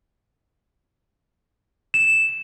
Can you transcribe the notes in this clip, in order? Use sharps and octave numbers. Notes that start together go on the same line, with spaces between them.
E7